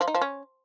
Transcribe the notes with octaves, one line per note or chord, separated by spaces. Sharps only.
F3
D#4
F3
C#4